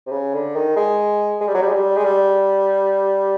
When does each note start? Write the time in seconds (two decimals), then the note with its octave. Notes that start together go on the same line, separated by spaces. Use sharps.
0.06 C3
0.12 C#3
0.34 D3
0.56 D#3
0.76 G#3
1.41 G#3
1.47 G3
1.54 F#3
1.62 G3
1.68 G#3
1.73 G3
1.96 G#3
2.04 G3